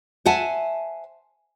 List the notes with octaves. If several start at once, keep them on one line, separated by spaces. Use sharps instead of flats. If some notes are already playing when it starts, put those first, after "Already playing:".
C5 E5 F#5 G#5 A5